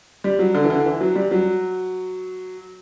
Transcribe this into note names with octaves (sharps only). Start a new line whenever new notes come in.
G3
F#3
D3
E3
D3
E3
F#3
G3
F#3